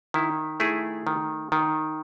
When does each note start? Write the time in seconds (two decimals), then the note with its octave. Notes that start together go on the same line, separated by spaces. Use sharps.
0.14 D#3 E4
0.60 A3 E4 G#4
1.07 D#3
1.52 D#3